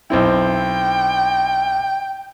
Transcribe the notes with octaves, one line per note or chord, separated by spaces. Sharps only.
B1 C4 E4 G5